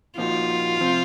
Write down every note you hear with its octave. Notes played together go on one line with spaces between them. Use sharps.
A#2 F3 A#3 D#4 F4 F#4
C3 F3 C4